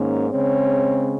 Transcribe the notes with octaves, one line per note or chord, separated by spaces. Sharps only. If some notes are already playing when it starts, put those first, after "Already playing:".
Already playing: G#2 D#3 A#3 C#4
C#3 G#3 C4 C#5